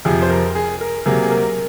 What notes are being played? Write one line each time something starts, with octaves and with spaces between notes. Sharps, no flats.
F2 C3 F3 G#4
C5
A#4
G#4
A#4
C3 F#3 A#3 G#4
G#4
A#4